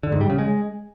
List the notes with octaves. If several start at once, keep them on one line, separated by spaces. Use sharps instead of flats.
D3
G#2
G3
C#3
G#3